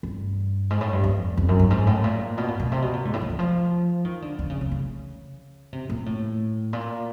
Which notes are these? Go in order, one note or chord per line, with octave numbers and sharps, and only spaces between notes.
G2
G#2
A2
G2
F2
F2
F#2
G2
G#2
A2
A#2
B2
A#2
B2
C3
B2
A#2
G#2
A2
D3
E3
F3
D#3
D3
D3
C#3
C#3
C#3
C3
A#2
A2
A#2